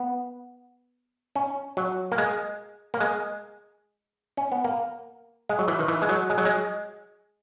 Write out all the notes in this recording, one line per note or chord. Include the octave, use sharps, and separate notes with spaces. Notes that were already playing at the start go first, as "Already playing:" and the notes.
Already playing: B3
C#4
F#3
A#3
G#3
A#3
G#3
C#4
B3
A#3
G#3
F#3
E3
D#3
E3
G#3
F#3
G#3
F#3
G#3